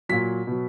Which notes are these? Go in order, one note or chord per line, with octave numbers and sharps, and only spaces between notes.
A#2 F#3 B6
B2 F#3